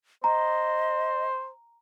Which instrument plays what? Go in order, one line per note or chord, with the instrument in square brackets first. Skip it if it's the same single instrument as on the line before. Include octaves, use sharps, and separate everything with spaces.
[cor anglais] C5 [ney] D#5 [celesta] A#5